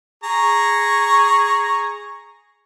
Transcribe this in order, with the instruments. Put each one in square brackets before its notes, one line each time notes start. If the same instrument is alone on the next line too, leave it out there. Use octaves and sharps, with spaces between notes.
[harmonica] G#4 A#5 C#6